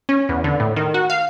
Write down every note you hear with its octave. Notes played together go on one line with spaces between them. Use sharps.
C#4
E2
D3
A2
D#3
F#4
F5